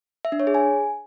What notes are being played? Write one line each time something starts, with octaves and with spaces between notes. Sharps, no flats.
E5
D4
C#5
G#4
G#5